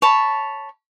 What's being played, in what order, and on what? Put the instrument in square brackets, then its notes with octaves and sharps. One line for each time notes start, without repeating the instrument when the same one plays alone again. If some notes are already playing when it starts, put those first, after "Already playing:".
[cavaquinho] C#5 A5 B5